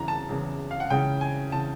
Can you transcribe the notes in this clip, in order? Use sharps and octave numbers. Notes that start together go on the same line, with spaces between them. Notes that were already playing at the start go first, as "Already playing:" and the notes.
Already playing: E2 C#3 E3 A#5
A5
E2 C#3 E3
F5
F#5
C#2 C#3 E3 G5
G#5
C#3 E3 A5